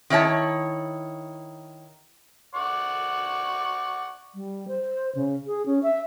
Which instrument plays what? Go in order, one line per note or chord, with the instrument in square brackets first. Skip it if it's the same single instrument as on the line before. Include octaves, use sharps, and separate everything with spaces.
[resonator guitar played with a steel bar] D#3 E4 C#5 A5
[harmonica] D5 F#5 C#6
[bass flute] G3
C5
C#3
G#4
C#4
E5